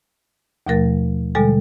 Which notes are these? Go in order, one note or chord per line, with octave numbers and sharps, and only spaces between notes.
D#2 B2 F3 A3 A#4 A6
B2 D3 G3 G#3 A4 G#5